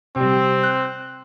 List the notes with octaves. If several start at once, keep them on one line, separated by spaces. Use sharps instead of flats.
C3 G3 C4
F6 F#6